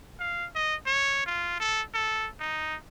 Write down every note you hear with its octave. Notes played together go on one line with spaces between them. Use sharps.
F5
D#5
C#5
F4
A4
A4
D#4